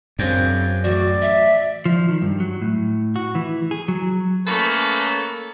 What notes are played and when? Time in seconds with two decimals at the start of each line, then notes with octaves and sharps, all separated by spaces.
0.19 F#2 C#3 C4 D4
0.84 A1 F#4 D5
1.22 E5
1.85 F3
2.09 D#3
2.22 G2
2.40 F#3
2.61 A2
3.16 F#4
3.35 E3
3.71 G#4
3.88 F#3
4.46 A3 A#3 C#4 A4 B4 B5